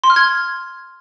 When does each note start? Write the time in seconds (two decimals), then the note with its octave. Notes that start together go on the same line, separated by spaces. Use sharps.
0.04 C6
0.10 F6
0.16 G#6